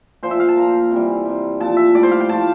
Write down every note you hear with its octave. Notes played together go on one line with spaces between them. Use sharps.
A#2 F3 C5
E5
F5
A5
A#2 F3 A#5
C3 E3 G3
C3 G3
A#2 F3 A5
E5
A2 G3 D5
C5
F5
G5
A2 F3 A5